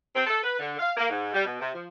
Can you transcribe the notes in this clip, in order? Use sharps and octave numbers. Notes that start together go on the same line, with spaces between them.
C4
A4
B4
D3
F5
A#3
G#2
G3
B2
C3
F3